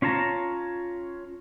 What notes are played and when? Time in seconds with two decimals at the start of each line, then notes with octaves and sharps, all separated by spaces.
0.02 C#4 F4 C#5 A5 A#5